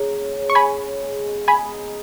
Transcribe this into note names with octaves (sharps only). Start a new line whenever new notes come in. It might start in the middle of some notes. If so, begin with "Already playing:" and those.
Already playing: C#3 A#3
F#3
C#3
C#6
F#4 G#5 B5
C#4
G#3
B2
G#4 G#5 B5
D#4